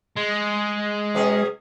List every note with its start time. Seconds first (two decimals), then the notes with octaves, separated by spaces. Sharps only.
0.17 G#3
1.15 B2 C#4 G#4